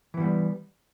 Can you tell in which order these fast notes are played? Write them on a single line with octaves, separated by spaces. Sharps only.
E3 B3 G3